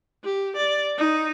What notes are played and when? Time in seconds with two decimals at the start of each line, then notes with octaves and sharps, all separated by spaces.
0.24 G4
0.57 D5
0.98 D#4